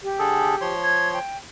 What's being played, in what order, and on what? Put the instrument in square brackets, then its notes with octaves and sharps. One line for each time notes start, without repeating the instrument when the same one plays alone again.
[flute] G4
[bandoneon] D3 G#4 A4
F3 C#5 C6
[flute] G#6
G5